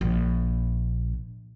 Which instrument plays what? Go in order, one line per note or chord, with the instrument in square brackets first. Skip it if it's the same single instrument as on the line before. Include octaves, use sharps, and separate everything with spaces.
[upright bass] A#1 A#2